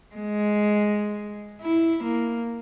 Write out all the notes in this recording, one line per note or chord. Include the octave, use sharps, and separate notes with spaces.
G#3
E4
A#3